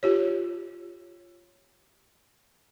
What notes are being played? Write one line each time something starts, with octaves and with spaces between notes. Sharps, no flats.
F4 G4 C#5